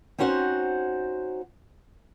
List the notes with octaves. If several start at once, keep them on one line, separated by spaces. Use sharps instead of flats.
C4 C#4 D#4 F#4 C5 F#5